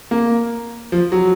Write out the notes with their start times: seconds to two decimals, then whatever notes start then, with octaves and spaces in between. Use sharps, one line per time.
0.11 A#3
0.92 F3
1.12 F#3